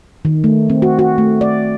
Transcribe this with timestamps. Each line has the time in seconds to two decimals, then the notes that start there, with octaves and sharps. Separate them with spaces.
0.25 D#3
0.44 A3
0.70 C4
0.82 F#4
0.99 F#4
1.18 A3
1.41 D5